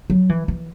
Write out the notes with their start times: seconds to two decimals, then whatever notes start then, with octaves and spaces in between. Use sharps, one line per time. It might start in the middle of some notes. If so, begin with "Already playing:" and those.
0.10 F#3
0.29 E3
0.48 E3